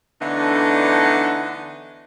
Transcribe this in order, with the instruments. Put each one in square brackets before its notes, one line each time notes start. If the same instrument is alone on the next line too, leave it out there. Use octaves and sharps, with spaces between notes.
[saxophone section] D3 E3 A3 B3 D4 D#4